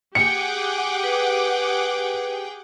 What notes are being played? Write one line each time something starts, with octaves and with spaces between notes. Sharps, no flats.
G4 G#4 F#5 G5 D6 C#7
B4